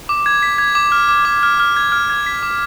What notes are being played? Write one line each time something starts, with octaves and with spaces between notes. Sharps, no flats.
D6
G#6
B6
G#6
D6
F6
D6
D6
F6
F6
G#6
F6
G#6
B6
D6